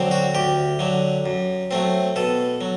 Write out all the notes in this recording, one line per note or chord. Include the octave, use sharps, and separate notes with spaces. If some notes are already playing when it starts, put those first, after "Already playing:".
Already playing: D3 F#3 C4
F#4
D2 G4
D3 F#3
F#2
F#3 A3 C4
B2 A4
F#3